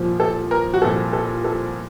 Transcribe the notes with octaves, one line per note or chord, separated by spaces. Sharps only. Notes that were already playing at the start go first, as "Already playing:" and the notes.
Already playing: C2 A#2 F3
A4
A#4
F#4
C2 A#2 F3 A4
A4
A4